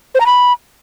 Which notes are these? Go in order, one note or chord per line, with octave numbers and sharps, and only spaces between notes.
C5
A#5
B5